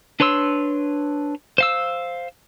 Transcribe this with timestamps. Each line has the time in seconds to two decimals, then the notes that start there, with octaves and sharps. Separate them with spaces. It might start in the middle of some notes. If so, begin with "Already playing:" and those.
0.20 D4 B4 C#5 C6 E6
1.58 C5 F5 E6